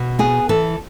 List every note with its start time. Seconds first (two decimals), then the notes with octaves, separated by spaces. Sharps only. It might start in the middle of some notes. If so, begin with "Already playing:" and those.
Already playing: B2
0.19 B3 G#4
0.49 E3 A4